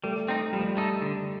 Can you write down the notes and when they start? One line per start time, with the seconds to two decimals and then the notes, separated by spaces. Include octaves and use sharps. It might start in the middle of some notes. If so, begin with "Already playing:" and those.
0.04 G3 A3
0.28 C4 D#4
0.53 F3 G3
0.77 A3 D#4 A4
1.02 D3